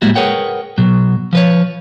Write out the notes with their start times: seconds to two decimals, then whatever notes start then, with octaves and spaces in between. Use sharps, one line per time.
0.02 A2 G3 G#3 A#3 E4 F#4
0.15 G#4 A#4 B4 C#5 F#5 G5
0.78 B2 F#3
1.33 F3 B4 C#5